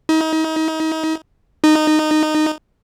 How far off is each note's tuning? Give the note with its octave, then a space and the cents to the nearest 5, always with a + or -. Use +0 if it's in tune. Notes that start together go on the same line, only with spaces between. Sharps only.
D#4 +35
D#4 -15